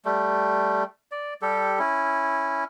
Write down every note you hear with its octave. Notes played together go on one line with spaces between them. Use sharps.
G3 A3
D5
G3 G4 A4
C#4 E4